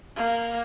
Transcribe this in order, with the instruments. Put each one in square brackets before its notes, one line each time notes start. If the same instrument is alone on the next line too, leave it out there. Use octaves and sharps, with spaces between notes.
[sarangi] A#3